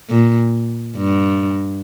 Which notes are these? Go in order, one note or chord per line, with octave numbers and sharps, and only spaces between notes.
A#2
G2